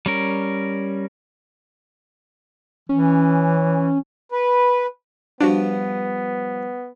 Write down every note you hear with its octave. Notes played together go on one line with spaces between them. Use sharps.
G3 C#4 A#4
E3 C#4
B4
G2 F3 B3 D4 F#4